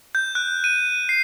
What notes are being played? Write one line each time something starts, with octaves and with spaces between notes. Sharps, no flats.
G6
F#6
D#7
C7